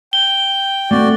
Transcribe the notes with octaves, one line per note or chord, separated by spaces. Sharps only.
G5 G7
A3 C4 F#4 D5